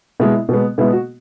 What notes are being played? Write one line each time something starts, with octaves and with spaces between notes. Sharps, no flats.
B2 G#3 B3 E4
B2 G#3 B3
B2 G#3 B3 E4
F#4